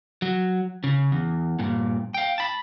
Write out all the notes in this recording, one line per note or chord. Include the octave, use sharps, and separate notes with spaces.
F#3
C#3
E2
G2 A#2
F5 G5
A5 B5